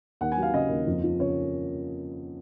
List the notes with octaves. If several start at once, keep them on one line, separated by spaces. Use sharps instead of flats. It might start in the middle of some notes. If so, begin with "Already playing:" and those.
D#2 F#5
G#5
F#3
F5
C#3 D#5
D#2
F2
F3
C#3 C#5